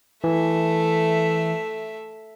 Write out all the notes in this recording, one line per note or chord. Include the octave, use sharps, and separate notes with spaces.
E3 A3 E5